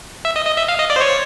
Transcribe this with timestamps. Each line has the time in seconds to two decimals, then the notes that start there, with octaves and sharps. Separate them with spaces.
0.25 E5
0.36 D#5
0.46 D#5
0.57 E5
0.68 F5
0.79 D#5
0.90 D5
0.96 C5
1.01 C#5